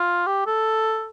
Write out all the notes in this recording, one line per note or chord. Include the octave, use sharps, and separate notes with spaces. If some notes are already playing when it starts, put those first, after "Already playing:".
Already playing: F4
G4
A4